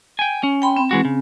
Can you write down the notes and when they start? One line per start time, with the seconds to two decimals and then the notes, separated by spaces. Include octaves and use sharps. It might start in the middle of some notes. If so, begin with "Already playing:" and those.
0.19 G5 G#5
0.43 C#4
0.62 G5 B5 C6
0.76 C4
0.91 E3 G#3 F#4
1.05 C#3